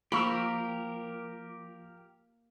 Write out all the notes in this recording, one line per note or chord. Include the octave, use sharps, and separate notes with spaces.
F3 A#3 F4 G4 A#4 B5 C#6 E6